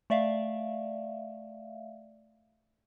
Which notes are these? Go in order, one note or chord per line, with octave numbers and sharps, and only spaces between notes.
A3 D5 E5 F5